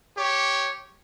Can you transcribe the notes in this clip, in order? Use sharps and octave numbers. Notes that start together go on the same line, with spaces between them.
G4 C#5